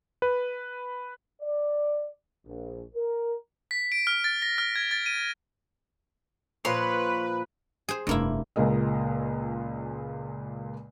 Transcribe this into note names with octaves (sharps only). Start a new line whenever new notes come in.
B4
D5
A#1
A#4
B6
D7
F6
A6
A#6
F6
G#6
A6
D#7
A#2 F3 B4 C#5 C6
G#4 C5
F1 G2 A#3 E4
C#2 A#2 G#3 A#4 D#5